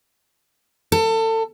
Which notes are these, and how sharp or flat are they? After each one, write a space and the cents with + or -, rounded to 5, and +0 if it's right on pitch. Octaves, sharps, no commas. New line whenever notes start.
A4 +30